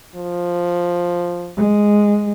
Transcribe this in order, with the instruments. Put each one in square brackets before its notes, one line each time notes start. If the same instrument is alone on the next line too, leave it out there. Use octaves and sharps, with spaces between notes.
[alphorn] F3
[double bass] G#3